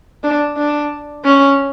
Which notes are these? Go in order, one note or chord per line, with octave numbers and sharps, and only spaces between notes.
D4
D4
C#4